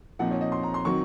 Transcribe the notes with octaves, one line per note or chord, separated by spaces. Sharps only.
A#2 F3 C4 D#4 F#5
C#5
D#5
C6
A#5
C6
D#3 F#3 C4 C#6